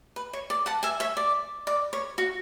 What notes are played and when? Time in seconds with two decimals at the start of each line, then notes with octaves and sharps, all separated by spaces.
0.16 B4
0.33 C#5
0.50 D5
0.66 F#5 A5
0.83 E5 G#5
1.00 C#5 E5
1.17 D5
1.67 D5
1.93 C#5
2.18 F#4